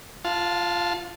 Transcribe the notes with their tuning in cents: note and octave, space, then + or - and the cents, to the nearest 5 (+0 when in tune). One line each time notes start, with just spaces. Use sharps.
F4 -10 F5 +40 A5 +0